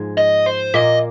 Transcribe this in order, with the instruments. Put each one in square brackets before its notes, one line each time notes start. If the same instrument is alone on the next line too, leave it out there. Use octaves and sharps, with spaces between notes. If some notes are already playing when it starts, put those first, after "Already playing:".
Already playing: [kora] G#2 F3 G#3
[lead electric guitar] D#5
C5
[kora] A#2 A#3 [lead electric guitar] D#5